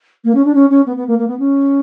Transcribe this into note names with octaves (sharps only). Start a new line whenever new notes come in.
A#3
C#4
D4
C#4
C#4
B3
B3
A#3
A#3
B3
C#4